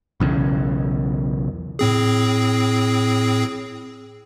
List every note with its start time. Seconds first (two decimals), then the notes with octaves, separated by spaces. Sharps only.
0.20 B1 E2 C#3
1.79 A2 C4 G#4